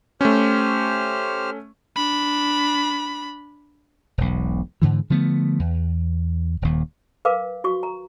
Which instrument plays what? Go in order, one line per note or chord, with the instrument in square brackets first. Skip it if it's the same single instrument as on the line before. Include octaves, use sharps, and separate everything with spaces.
[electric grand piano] A3 C#4 [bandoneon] G4 C5 F6
[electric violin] D4 B5
[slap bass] E1 B1
G#2 D3 E3
D3 F3 A3 B3
E2
D#1 D#2
[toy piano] A#4 B4 F5 D6
F#4 C#6
A#5